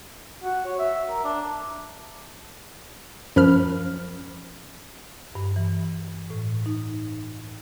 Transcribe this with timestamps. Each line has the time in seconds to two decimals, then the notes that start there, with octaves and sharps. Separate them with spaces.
0.44 F#4
0.66 C#5
0.79 E5
1.09 A#4
1.24 D4
3.36 F#2 F3 B5 F6
5.35 G2
5.56 E3
6.30 A2
6.66 D#4